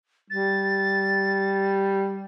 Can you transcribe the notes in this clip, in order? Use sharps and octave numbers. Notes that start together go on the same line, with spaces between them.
G3 A6